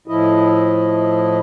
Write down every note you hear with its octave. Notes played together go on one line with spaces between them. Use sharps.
A2 F3 E4 D#5